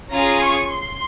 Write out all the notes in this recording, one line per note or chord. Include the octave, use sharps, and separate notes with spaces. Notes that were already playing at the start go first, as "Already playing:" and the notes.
C#4 F4 G#4 A#5
C#6
C6